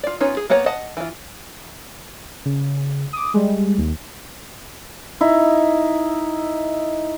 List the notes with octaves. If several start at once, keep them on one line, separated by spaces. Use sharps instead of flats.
F4 D5
B3 C#4 D#4 F4 C#5
G#4
A#3 B3 C#5 F#5 A#5
D#5 F#5 A5
E3 F4
C#3
D6 D#6
G3 G#3
D#2
D#4 E4